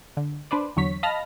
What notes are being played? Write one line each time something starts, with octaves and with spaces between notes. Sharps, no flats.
D3
D4 B4 C5 D5
E2 D3 F#3 C#5 B6
D#5 F5 A5 B5 F6 A#6